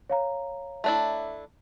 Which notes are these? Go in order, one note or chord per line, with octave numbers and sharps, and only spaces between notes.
C#5 F5 A#5
A3 D4 E4